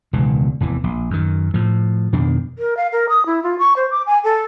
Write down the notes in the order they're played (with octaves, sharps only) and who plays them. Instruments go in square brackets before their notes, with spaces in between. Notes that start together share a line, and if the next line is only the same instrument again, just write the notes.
[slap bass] E1 C#2 B2 D#3
F1 E2 E3
A#1
F#2 D#3
A2 F3
F2 B2 D#3 D4
[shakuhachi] A#4
F5
A#4
D#6
E4
F4
C#6
C5
D6
G#5
A4